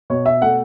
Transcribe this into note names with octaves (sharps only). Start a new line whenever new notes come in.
B2 C#5
E5
A3 F#5